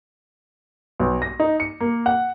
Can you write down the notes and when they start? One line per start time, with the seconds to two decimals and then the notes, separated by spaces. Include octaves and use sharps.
0.99 B1
1.22 A#6
1.40 D#4
1.60 C#7
1.80 A#3
2.06 F#5